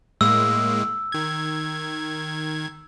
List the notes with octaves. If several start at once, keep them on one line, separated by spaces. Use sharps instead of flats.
A2 G#3 A#3 E6
D#3 G#6